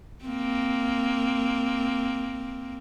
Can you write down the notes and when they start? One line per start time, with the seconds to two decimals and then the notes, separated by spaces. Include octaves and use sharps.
0.24 A#3 C4